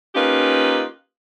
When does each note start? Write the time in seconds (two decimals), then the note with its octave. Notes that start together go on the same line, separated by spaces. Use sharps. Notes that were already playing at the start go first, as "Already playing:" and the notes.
0.15 A#3 C#4 D#4 F4 G4 B4